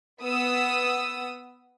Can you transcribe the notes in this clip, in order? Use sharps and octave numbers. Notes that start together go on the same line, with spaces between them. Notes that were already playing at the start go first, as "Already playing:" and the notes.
B3 D#6 E6